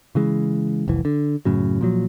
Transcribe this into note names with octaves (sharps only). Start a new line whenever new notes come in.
C#3 E3 G#3
F1 C2 E3
D3
F#2 A2 C#3 F#3
A#2 F3 F#3